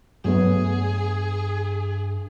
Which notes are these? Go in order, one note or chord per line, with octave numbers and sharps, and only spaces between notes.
G2 F#3 A3 B3 G#4